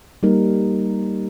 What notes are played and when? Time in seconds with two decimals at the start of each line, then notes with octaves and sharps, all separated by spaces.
0.23 G3 A#3 D#4 A#4